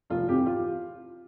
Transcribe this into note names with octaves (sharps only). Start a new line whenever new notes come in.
F1 F4
F2 C3 E3 G4
F4